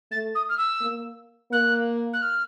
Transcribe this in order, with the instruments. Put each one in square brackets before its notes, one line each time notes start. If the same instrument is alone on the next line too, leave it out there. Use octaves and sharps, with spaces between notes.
[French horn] A3 [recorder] A6
[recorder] D#6
F6
E6
[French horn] A#3
[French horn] A#3 [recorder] F#6
[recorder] F#6
F6